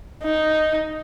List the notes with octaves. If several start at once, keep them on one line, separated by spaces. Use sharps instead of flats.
D#4